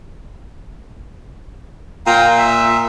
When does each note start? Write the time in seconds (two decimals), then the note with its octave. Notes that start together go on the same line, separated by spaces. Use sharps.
2.07 A#2 F5 G5 A#5
2.38 E5